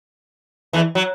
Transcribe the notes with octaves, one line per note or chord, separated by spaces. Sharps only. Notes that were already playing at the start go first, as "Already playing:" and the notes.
E2 E3
F#3